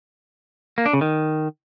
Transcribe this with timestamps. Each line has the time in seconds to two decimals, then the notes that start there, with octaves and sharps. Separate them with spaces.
0.78 A#3
0.86 D4
0.93 C#3
1.01 D#3